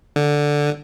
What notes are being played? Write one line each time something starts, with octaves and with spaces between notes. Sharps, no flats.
D3